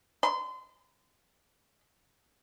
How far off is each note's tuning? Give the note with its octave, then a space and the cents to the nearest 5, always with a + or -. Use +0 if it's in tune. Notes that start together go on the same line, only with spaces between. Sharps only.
C6 -30